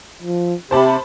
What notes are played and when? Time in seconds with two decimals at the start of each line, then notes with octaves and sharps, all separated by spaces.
0.22 F3
0.71 C3 G4 C5 A5 B5